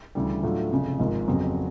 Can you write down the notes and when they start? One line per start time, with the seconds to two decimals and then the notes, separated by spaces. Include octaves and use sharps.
0.15 D2 C#3 E3 G3
0.43 A2 F#3 A3 D4 F4
0.72 F1 F2 C#3
0.99 G#1 G#2 F3
1.28 F2 C#3 F#3 B3